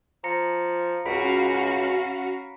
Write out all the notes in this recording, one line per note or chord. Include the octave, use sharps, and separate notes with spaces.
F3 A#5 A#6 C#7
C#2 C#4 F#4 F5 B5 B6 D7